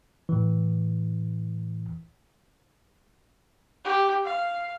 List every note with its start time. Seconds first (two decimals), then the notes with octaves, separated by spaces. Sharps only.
0.29 A2 E3
3.84 G4
4.24 F5